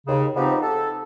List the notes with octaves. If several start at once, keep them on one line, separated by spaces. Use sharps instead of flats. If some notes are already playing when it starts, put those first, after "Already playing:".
D#2 C#3
F3 G#3 B3 C4 D#4 G4
A4